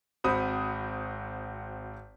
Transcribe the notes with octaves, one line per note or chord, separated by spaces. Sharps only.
G#1 C4 F#4 B5 D#6